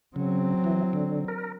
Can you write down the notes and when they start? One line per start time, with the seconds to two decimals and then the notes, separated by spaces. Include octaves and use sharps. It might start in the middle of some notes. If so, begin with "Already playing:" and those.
0.16 C#3 F#3 C4
0.64 E3
0.93 D3
1.28 A#4